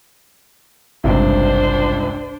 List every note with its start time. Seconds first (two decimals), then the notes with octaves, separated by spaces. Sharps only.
1.04 G#1 C#2 G2 C3 D4 C5